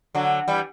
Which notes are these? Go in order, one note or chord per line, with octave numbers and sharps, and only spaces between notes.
D3 F#3
E3 G3